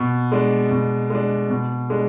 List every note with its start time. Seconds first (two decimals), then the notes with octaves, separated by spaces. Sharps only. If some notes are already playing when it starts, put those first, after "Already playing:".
Already playing: B2
0.32 G#3 D4
0.71 B2
1.10 G#3 D4
1.50 B2
1.90 G#3 D4